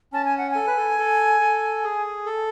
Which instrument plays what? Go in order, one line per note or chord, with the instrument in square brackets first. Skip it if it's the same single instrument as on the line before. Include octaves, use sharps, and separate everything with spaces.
[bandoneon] C#4 [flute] A5
[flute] G#5
F#5
[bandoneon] A4 [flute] G#5
[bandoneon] B4
A4
A4
A4
G#4
A4